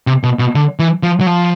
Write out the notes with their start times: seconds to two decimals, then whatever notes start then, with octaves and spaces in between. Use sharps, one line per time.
0.07 C3
0.23 B2
0.39 B2
0.55 D3
0.79 E3
1.03 F3
1.20 F#3
1.27 F3